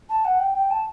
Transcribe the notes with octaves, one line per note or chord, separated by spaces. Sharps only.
A5
F#5
G5
G5
A5